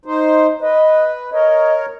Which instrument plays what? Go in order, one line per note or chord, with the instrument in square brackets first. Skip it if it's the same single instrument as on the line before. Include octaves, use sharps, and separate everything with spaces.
[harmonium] D#4 C5
[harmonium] B4 [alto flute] D#5
[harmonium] A#4 C#5 [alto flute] D#5